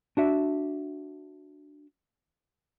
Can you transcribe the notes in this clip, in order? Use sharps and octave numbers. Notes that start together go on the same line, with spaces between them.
D4 F#4 E5